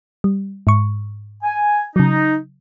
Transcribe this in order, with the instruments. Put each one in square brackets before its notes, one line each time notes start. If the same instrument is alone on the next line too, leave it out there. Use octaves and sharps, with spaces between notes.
[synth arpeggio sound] G3
G#2 C#6
[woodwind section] G#5
[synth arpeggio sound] C#3 F#3 [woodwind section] D#4